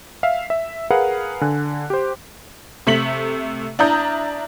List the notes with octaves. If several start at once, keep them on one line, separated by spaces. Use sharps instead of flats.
E5 F5
E5
G#4 A#4 B4 F5 F#5
D3 G#5 F#6
G4 C5
C3 A3 B6 F#7
D4 E4 A#5 D#6 G6